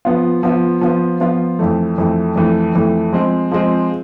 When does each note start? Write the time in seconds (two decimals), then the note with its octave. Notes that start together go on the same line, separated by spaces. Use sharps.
0.05 F3 B3 F4
0.43 F3 B3 F4
0.81 F3 B3 F4
1.20 F3 B3 F4
1.59 F2 E3 A3
1.98 F2 E3 A3
2.36 F2 E3 A3
2.75 F2 E3 A3
3.13 F3 G#3 C4
3.51 F3 G#3 C4